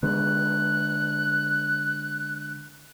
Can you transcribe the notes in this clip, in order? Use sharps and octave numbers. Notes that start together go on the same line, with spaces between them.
D3 G#3 B3 F#6